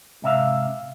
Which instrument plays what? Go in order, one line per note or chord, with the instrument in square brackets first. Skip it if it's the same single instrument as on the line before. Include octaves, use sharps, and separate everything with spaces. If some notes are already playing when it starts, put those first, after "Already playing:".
[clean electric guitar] G#2 C3 E5 F5